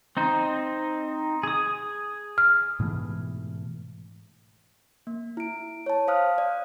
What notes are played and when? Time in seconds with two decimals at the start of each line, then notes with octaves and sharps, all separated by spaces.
0.17 C4 D#4 C5
1.43 G#4 D#6
2.38 F6
2.80 G#2 B2 E3 A3
5.07 A#3
5.37 E4 D7
5.86 C#5 A5
6.07 C5 F5 D#6 F6 F#6
6.38 D5